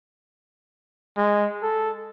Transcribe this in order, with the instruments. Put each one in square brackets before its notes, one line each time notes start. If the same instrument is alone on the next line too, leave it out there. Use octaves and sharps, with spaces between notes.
[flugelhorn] G#3
A4